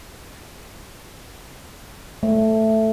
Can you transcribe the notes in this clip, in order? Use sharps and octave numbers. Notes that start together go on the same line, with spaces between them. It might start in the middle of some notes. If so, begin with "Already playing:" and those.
A3